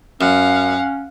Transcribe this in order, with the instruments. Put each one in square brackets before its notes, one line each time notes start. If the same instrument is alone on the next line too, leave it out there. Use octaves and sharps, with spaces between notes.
[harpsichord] F#2 [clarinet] C#4 [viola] F5 F#5